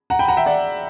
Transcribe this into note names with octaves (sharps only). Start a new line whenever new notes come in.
F#5 A#5
G5 B5
F#5 A#5
E5 G5
D5 F#5